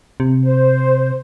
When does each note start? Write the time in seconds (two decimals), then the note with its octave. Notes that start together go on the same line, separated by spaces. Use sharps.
0.20 C3
0.43 C5